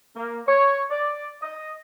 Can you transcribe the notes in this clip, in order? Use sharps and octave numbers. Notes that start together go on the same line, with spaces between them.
A#3
C#5
D5
D#5